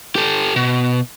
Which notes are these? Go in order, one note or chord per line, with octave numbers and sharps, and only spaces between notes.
G4 A4
B2